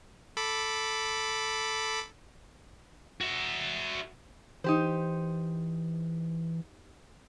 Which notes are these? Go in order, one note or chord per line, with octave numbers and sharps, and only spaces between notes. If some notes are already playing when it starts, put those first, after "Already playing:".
A4 B5 D6
F#4 E5
E3 D#4 G4 C5